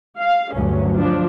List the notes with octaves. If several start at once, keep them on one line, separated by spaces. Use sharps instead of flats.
F5
D2 G2 F#3 C#4
F3 D4